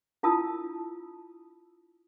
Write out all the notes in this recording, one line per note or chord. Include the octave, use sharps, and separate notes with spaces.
D4 E4 F4 A5 D#6 E6